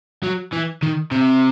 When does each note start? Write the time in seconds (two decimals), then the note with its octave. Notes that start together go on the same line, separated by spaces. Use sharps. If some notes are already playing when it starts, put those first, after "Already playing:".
0.24 F#3
0.53 E3
0.83 D#3
1.12 C3